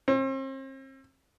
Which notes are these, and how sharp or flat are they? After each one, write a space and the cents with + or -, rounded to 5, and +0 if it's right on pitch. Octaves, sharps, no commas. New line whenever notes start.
C4 +40